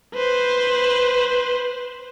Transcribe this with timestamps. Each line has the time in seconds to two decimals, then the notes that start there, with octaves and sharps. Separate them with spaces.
0.15 B4 C5